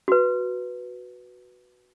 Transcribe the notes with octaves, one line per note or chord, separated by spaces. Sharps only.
F#4 B4